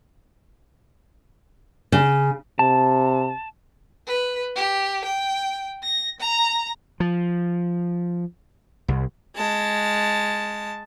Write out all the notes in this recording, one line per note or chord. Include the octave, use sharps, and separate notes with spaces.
C#3
C3 A5
B4
G4
G5
A#6
A#5
F3
C2
G#3 A5